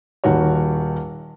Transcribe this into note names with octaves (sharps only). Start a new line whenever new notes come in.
D#1 D#3 F#4 C#5